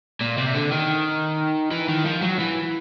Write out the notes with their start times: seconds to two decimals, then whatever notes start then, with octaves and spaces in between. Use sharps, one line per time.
0.21 A#2
0.37 C3
0.54 D3
0.71 D#3
1.71 E3
1.89 D#3
2.05 F3
2.22 F#3
2.39 E3